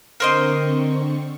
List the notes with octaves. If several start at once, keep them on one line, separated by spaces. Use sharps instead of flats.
D3 C4 A#4 C5 D#5 C#6